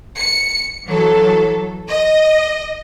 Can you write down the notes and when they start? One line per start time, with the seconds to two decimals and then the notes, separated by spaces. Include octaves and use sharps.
0.17 C#7
0.86 E3 F#3 A4
1.89 D#5